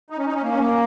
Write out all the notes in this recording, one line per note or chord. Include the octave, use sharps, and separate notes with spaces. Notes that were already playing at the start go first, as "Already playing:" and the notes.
D#4
C#4
D#4
C#4
A#3
C#4
A#3